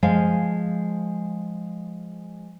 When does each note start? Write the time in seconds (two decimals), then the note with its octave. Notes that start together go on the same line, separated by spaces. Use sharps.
0.03 F3 G#3 F5 G#5